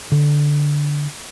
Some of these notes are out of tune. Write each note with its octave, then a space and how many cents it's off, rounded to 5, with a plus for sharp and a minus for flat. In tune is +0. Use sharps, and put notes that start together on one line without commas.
D3 -5